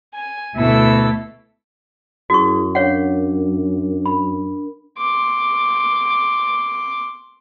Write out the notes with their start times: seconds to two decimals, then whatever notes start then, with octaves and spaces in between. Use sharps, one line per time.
0.14 G#5
0.55 D2 B2 E4 A4 E6
2.30 F#2 E4 F#4 G#4 C#6 D#6
2.75 D4 A#4 C#5 F5 F#5
4.06 B5
4.98 C6 D6